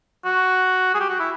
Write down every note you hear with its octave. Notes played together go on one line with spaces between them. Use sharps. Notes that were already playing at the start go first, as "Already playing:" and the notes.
F#4
G#4
G4
F#4
E4